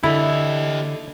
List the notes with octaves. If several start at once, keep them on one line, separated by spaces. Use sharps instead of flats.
D3 E4 G4 D#5